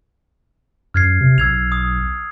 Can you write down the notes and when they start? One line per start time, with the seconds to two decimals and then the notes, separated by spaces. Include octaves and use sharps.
0.94 F#2 F6 G#6 C7
1.21 C3
1.38 B1 E6 G#6 F7
1.72 D#6